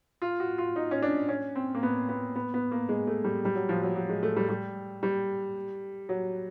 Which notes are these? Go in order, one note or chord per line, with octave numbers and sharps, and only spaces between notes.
F4
F#4
F4
D#4
C#4
D4
C#4
C4
A#3
B3
B3
B3
B3
A#3
G#3
A3
G3
G3
F#3
F3
F#3
F#3
G#3
A3
G3
G3
G3
F#3